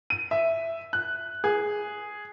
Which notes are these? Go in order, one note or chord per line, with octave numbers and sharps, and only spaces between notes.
D#7
E5
F#6
G#4